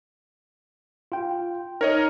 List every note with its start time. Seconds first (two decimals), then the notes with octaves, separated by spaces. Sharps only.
1.12 F4 G5
1.81 D#4 A#4 C#5 D#5